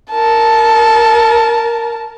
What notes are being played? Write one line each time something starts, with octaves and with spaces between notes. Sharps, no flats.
A#4 A5